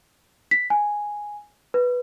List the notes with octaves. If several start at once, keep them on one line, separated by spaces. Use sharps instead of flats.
B6
G#5
B4